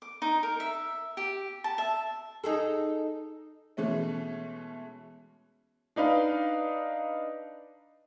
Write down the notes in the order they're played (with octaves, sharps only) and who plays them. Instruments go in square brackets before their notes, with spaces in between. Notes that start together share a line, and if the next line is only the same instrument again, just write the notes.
[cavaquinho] D6
D#4
A#4
E5
G4
A5
E5
[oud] D#4 G#4 A4
[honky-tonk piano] B2 E3 G#3 A3 C#4
[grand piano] D4 D#4 B4 F5